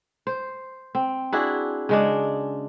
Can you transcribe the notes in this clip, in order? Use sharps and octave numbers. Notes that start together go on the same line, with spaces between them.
C5
C4
D4 E4 F#4 G#4
C#3 G#3 D4